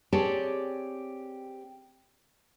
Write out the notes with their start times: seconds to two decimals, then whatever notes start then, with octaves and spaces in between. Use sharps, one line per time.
0.13 C4 G4 G#4 C#5 D5 A5